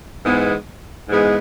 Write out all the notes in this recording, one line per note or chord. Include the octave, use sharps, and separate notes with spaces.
G#2 E3 G#3 B3
G#2 E3 G#3 B3